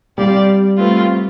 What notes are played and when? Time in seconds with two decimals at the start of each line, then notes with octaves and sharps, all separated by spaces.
0.17 G3 C4 G4 D5 F5
0.78 A3 C4 F4 B4